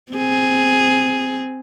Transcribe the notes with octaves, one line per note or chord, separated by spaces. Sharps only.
C4 G#4